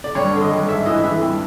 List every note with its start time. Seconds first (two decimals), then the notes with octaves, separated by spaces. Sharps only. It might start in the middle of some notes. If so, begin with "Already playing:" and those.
0.04 D5
0.15 G2 C#5
0.33 D3
0.41 D#5
0.51 G2
0.68 G#2 E5
0.86 E3 D#5
1.04 E3 E5
1.22 G2